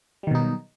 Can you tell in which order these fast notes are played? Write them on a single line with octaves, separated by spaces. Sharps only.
G3 D#3 B2 D#4 F#3